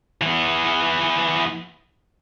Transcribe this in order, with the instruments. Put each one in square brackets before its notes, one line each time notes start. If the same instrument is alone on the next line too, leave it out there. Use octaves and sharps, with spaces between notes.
[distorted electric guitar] E3 B3